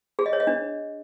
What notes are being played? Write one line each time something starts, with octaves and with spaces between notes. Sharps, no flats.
G#4
D#5
C#5
D#5
D4